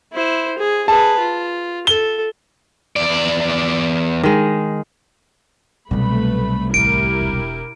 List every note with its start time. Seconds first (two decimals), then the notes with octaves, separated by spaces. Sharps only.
0.13 E4 C5
0.58 G#4
0.88 G#4 B4 A5
1.19 F4
1.87 A4 G7
2.96 E2 D5
4.23 D#3 G#3
5.91 C2 B2 F#3 A3 B4 B5
6.74 A1 E4 G4 A#4 D7
7.21 E1